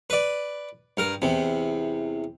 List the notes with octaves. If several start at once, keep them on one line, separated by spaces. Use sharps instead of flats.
B4 D5
G2 A#4
E2 C3